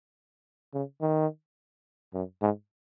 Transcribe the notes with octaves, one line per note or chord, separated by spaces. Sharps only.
C#3
D#3
F#2
G#2